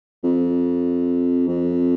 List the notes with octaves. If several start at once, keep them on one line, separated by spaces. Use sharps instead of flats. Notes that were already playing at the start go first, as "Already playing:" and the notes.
F2
F2